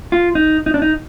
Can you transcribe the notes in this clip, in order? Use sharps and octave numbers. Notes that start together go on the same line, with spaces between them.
F4
D#4
D#4
D4
D#4